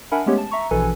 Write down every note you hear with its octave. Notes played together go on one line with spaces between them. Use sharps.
D4 A#4 E5 F#5 G#5 B5
G#3 A3 B3 C#4 G4 C#5
A5
E5 A#5 C#6
A#1 B2 E3 A4 B4 G#5